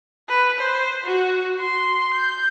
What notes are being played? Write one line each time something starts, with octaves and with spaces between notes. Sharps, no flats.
B4
C5
F#4
C6
G6